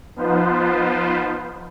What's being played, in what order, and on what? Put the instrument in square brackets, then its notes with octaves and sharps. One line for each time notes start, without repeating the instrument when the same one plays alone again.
[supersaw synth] F3 B3 D#4 F4 B4 C5